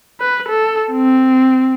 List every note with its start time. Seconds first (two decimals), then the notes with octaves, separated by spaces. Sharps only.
0.20 B4
0.49 A4
0.91 C4